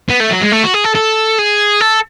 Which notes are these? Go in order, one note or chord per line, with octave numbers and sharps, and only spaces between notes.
B3
A3
F#3
G#3
A3
F#4
G#4
A4
A4
G#4
A4